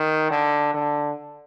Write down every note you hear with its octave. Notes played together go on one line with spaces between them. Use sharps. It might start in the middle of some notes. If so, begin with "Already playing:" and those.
Already playing: D#3
D3
D3